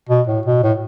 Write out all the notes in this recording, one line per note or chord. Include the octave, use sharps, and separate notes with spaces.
B2
A2
B2
A2